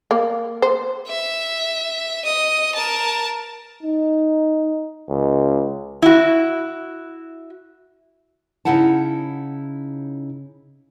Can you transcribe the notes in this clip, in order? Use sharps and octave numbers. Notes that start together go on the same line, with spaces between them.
A#3
C5
E5
D#5 D#6
A#4 A5
D#4
C#2
E4 F#4
C#3 G#3 D#4 E4 F#5 A5